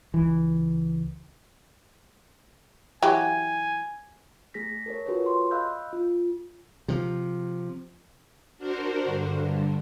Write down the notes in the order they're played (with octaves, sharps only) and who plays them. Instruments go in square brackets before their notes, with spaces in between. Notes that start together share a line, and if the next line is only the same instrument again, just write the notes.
[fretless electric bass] C#2 E3
[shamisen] E3 F#3 G4 [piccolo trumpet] G#5
[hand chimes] A3 G#4 A#6 B6
A4 A#4 C#5
F4 F#4 G#4 A4 B4 C#5
C6
D#5 F5 B5 E6 F#6 G6
F4
[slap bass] C3 F3
[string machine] D4 F#4 A#4 C5
G2 D3